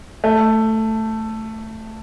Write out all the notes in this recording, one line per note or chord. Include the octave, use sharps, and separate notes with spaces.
A3